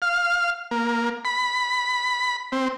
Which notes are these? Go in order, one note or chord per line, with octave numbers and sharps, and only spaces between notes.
F5
A#3
B5
C4